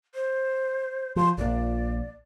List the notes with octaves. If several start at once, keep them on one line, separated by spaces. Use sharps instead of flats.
C5
F3 C6
A#1 A#2 D5